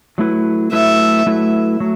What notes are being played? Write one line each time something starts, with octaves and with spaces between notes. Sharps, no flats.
F#3 A3 E4 B4
F#3 A3 E4 B4 E5
F#3 A3 E4 B4
F#3 A3